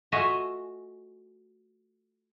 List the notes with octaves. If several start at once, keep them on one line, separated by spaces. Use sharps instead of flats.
A3 F4 F#4 D#5 E5 G#5